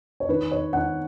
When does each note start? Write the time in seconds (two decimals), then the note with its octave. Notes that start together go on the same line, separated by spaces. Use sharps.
0.20 C#5
0.29 D#3 B4
0.51 C#5
0.73 D#3 F#5